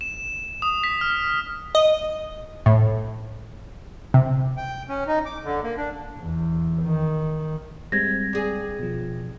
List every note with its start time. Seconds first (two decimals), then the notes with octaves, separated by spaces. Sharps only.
0.01 E7
0.62 D#6
0.84 B6
1.01 F6
1.75 D#5
2.66 A2
4.14 C3
4.57 G5
4.89 C#4
5.07 D#4
5.26 D6
5.44 D3
5.63 A#3
5.77 D4
6.20 E2
6.83 D#3
7.92 G3 G#3 C4 G#6 A#6
8.33 G2 G#4
8.79 B2 F3